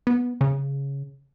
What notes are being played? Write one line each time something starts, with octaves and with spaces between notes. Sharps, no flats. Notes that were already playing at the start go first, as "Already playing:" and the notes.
B3
C#3